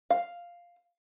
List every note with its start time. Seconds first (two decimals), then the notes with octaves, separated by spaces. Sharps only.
0.10 F5